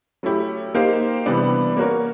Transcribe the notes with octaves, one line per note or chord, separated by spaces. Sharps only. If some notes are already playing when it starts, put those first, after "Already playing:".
F#3 A3 C#4 E4 G4
A#3 D#4 G4 C5 F5
C3 E3 G3 B3 D4
A#3 C#4 F#4 A#4 C#5